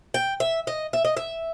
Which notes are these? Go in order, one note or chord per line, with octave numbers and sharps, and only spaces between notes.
G5
E5
D#5
E5
D#5
E5